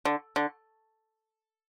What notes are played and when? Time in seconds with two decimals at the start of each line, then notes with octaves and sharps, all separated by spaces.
0.05 D3
0.36 D3